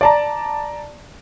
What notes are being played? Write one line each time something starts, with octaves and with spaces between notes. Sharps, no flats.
D5 A5 A#5